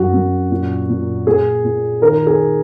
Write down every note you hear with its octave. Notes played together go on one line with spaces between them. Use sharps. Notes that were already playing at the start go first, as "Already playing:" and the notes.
Already playing: F#2 F#4
F#2
A#2
A#2
A#2 G#4
A#2
D#3 A#4
G#4